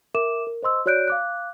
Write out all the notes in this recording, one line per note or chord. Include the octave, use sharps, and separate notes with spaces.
A#4 E5 D6 E7
A#4
C5 D#5 C6 E6
F#4 C#5 D5 F#6 G6 D7
F5 D6 F#6